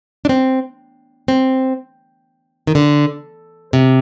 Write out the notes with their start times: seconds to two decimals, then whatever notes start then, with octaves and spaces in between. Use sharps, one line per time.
0.25 D4
0.29 C4
1.28 C4
2.67 D#3
2.75 D3
3.73 C3